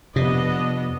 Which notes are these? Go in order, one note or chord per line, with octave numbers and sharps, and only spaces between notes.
F2 C3 B3 D4 D#5